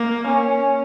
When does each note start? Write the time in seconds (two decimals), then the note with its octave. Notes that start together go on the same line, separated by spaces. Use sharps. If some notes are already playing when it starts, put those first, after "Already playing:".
Already playing: A#3
0.28 C#4